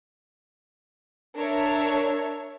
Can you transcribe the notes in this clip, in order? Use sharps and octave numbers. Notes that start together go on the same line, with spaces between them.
D4 A#4 C#5 E5